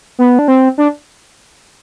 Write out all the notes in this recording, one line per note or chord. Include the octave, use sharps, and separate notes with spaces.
B3
D4
C4
D4